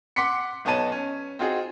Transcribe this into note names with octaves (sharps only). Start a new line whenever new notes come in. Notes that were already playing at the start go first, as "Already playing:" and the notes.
F#5 C6 D6 B6 C#7
B1 B3 D#4 C#5 A5 D#7
C#4
C4 D#4 F4 F#4 G#4